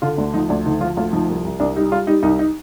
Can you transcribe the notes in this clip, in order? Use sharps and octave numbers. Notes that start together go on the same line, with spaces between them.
D3 F4
D2 D4
F3 D#4
D2 D4
D3 D#4
F3 F4
D2 F4
F3 D#4
C2
C2
C2 D4
G3 D#4
G3 F4
G3 D#4
C2 D#4
D#4